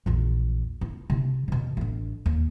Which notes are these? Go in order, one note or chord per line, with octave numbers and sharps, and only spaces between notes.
A#1 E2
E4
C3 E4
E2 B2
A1 D4
D#2